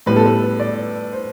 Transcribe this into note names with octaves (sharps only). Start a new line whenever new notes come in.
A2 G3 B3 B4
A4
B4
D5
C5